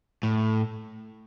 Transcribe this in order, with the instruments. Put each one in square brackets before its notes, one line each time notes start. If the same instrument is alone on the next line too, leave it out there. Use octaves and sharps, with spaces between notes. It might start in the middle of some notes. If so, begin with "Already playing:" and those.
[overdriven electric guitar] A2